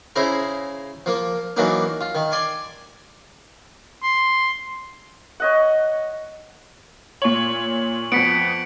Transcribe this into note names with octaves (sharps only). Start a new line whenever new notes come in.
C#3 E4 G#4 C5 A#5
F3 A#3
E3 F#3 A#3 D4 D#4
F4
D#3
D5 G#5 C6
C6
C#5 D#5 F#5
A#2 C#5 C#6 F#7
F2 B3 B6 C#7 D7